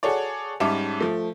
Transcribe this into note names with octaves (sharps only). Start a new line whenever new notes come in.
F#4 G#4 A4 C#5 D5
G#2 G3 C#4 E5 A5 D6
F3 A3